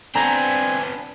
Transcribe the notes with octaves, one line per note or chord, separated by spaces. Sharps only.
B3 C4 D4 G#5 A#5